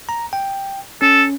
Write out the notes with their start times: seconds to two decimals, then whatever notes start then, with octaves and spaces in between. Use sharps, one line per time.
0.09 A#5
0.33 G5
1.02 C#4 A4